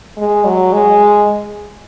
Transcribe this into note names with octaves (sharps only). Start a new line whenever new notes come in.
G#3
F#3
G#3